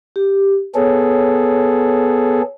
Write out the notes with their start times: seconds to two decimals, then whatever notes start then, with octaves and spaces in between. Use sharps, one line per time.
0.16 G4
0.75 B3 G#4 A4 C#5